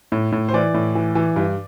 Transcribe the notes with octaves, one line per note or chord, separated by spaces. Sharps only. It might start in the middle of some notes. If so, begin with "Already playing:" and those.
A2
A2
C5
E3 D5
A2
E3
E3
G2